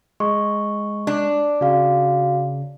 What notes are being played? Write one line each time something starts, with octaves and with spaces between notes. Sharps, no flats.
G#3 C#6
D4
C#3 F#4 F5